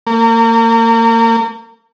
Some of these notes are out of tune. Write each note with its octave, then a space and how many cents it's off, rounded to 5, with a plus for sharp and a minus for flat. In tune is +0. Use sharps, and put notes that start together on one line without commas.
A#3 -35